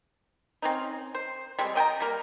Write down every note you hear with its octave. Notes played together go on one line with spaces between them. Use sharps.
C4 C#4 D#4
C5
G3 G#3 C4
D#5 G5 G#5 A#5
G3 A#3